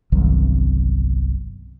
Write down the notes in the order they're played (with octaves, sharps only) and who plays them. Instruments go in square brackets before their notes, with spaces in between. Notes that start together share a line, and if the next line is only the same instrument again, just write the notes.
[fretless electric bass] G1 C2 D#3 F#3